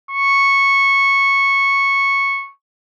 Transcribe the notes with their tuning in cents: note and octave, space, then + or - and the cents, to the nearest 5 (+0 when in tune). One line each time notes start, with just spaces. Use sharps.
C#6 -10